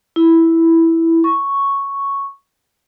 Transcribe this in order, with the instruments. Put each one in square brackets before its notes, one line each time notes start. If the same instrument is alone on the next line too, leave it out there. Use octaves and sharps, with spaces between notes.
[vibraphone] E4
C#6